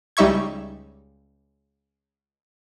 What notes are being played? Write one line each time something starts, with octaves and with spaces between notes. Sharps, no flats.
C#2 G3 D#4 E5 C#6 G#6